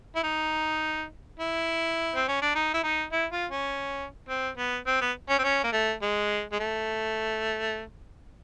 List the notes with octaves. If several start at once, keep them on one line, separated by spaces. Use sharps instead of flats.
E4
D#4
E4
C4
C#4
D4
D#4
E4
D#4
E4
F4
C#4
C4
B3
C4
B3
C#4
C4
C#4
A#3
A3
G#3
G#3
A3